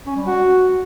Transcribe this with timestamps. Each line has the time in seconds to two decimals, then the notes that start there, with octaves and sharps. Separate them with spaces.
0.07 C#4
0.16 G3
0.26 F#4